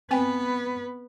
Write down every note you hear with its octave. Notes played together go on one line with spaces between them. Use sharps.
B3 C4 B4 G5 G#5